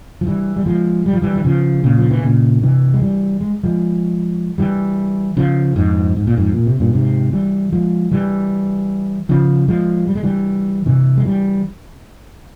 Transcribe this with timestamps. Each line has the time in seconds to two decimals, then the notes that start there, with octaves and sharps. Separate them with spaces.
0.21 F3
0.27 E3 G3
0.56 G3
0.66 F3 G#3
1.06 G3
1.13 F3
1.22 E3 G3
1.36 E3
1.44 C#3 F3
1.84 A#2 C#3
1.98 F3
2.11 E3
2.23 A#2 C#3
2.63 C3 E3
2.94 G#3
3.02 E3 G3
3.41 G#3
3.63 F3 G#3
4.58 E3 G3
5.37 C#3 F3
5.76 F2 G#2
6.16 G#2
6.27 A#2
6.37 F2 G#2
6.54 A#2
6.67 C3
6.80 G2 A#2
6.93 G#2 C3
7.33 E3 G3
7.73 F3 G#3
8.12 E3 G3
9.29 C#3 F3
9.68 F3 G#3
10.07 G3
10.15 G#3
10.23 E3 G3
10.86 C3 E3
11.17 G#3
11.25 E3 G3